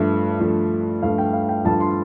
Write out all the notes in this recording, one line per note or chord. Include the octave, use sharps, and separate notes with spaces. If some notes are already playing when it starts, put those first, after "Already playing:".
Already playing: G2 F3 A3 E5
G2 F3 A3
G2 F3 A3 F5
G5
F5
G5
G2 F3 A3 A5
C6